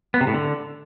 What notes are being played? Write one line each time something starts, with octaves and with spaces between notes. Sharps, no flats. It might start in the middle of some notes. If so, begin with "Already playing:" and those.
B3
C3
A2
D3